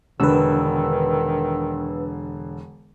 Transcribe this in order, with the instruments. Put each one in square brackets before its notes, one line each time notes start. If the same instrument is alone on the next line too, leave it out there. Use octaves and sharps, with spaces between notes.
[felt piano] E1 D3 [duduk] D#3 [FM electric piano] B4 E6